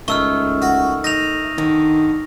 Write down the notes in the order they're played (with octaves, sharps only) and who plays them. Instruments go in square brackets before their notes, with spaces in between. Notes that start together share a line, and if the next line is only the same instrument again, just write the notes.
[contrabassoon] C#2 [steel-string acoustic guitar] D#3 A3 [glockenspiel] C#6 E6 F6
[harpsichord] F#4
[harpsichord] D#4 [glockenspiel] A#6 F7
[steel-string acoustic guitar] D3 [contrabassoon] D#3